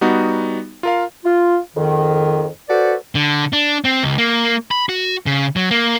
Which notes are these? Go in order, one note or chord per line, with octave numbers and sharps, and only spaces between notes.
G3 B3 D#4 F#4
F4 A#4 F5
F4
F2 G#2 D#3
F#4 A4 B4 C5 D5
D3
D4
C4
C#2
A#3
B5
F#4
C#3
F#3
A#3